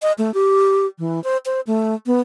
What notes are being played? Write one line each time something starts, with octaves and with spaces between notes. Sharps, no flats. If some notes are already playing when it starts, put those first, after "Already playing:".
D#5
A3
G4
E3
C5
C5
A3
B3